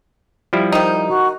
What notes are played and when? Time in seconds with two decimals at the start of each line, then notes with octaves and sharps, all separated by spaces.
0.53 F3 G3 E4
0.72 D#3 D#4 C5
1.08 F#4